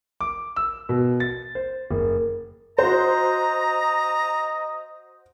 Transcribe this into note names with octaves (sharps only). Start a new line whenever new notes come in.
D6
E6
B2
A6
C5
F#1
F#4 C5 D#5 A#5